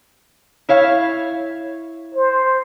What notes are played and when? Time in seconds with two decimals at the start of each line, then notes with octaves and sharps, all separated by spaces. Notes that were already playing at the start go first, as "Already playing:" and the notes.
0.69 E4 C#5 F5
2.15 C5